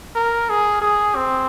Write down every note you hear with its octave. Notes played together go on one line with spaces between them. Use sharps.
A#4
G#4
G#4
C4